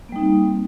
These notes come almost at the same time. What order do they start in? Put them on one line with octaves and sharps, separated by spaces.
A#3 G3 D#4 C4